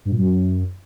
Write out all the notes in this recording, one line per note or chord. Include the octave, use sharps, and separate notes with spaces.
G2
A#2
F#2